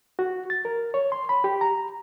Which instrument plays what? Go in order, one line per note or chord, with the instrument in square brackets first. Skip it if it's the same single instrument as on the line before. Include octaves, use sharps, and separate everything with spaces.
[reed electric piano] F#4
A6
A#4
C#5
C6
B5
G4
A#5